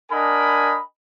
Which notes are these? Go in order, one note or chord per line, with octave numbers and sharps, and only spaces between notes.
D4 A#4 D#5 F#5 G#5 B5